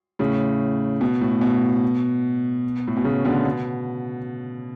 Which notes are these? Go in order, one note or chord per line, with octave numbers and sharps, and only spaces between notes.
A2 C#3
B2
A2
B2
A2
B2
A2 C#3
B2 D3
B2